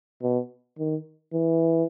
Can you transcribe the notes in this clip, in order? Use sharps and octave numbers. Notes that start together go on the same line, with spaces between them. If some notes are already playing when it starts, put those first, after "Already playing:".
B2
D#3
E3